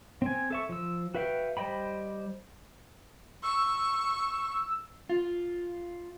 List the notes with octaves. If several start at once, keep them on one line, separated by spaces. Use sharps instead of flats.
C4 G#5
A4 E5 C#6
F3 E6
F#4 B4 E5 F5 G5
G3 C5 D#5 G5 B5
C#6 E6
F4